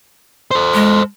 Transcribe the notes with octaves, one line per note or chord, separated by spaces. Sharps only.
A4 C5
G#3